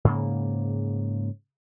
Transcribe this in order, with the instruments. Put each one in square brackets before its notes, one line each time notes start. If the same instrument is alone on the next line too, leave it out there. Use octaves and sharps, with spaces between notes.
[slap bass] G#2 C#3 A#3